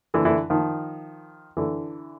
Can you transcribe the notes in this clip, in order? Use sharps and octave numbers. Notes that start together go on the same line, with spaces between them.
D3 E3
D3 E3
D#3 F3
D3 E3